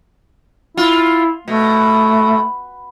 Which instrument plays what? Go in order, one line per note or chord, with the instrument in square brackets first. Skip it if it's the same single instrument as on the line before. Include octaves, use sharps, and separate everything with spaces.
[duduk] E4 [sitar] F4
[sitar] B2 [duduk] A3